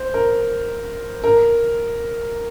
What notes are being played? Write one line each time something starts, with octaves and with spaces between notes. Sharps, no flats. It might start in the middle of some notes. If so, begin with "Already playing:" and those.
Already playing: C5
A#4
A#4